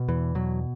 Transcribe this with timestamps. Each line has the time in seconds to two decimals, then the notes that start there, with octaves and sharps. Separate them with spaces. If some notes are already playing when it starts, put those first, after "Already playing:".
Already playing: B2
0.08 E2 E3
0.35 B2 F#3